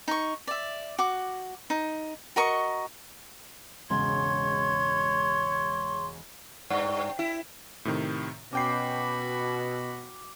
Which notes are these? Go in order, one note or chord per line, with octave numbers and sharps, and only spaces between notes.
D#4 C#6
D5 E5
F#4 D6
D#4
F#4 A#4 D#5 C#6
E1 G#2 C#3 C#5 C6 G#6
G2
E4
A2 C3 D#3
B2 C#4 F#4 G5 B5 D6 C7